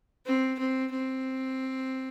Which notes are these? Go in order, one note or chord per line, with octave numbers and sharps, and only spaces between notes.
C4
C4
C4